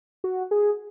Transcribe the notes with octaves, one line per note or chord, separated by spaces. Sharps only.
F#4
G#4